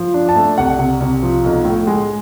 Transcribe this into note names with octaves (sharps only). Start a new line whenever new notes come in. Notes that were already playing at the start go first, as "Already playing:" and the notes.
Already playing: F3
D4
A5
A3
C2 F#5
C3
C2
F3
B1
A2
G#3